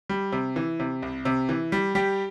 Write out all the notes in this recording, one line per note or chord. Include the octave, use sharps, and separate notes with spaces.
G3
C3
E3
C3
C2
C3
E3
G3
G3 G4